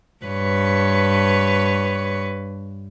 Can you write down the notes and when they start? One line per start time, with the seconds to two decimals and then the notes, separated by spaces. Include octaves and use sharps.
0.25 G2 B4 C#5